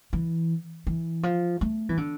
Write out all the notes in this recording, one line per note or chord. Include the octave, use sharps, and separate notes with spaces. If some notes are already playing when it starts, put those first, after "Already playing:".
E3
E3
F3
A3
E3
D3